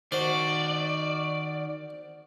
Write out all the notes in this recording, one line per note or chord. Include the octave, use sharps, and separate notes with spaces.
D#3 F#4 C5 D5